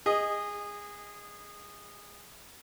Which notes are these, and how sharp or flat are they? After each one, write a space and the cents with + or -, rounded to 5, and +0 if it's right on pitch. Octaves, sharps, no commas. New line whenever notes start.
G#4 -20 D#5 +0